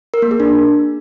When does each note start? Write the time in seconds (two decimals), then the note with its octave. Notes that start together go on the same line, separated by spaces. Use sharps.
0.14 A#4
0.22 A#3
0.31 G#4
0.40 D4